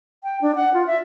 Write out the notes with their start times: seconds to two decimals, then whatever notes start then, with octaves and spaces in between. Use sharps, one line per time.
0.23 G5
0.42 D4
0.56 F#5
0.74 F4
0.87 E5